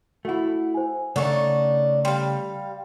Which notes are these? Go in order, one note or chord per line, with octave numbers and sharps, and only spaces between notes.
A3 E4 F#4 F#5
C5 G#5
C#3 A3 D4 D#4 C#5 D5 F#5 C#6
G3 F5 C6